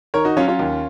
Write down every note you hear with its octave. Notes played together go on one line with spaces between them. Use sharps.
D#3 A#4 C#5
D#4 F#4
F#3 C#4 F4
C#4 F4
D#2